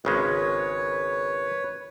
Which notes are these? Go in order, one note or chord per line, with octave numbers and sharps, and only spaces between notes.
G#1 C#3 G#3 B4 C#5